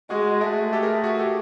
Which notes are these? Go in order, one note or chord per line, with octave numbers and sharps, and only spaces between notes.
G#3 F#4 G#4
A3 F#4 G#4
G4 A4
G#4 A#4
F#4 G#4
G4 A4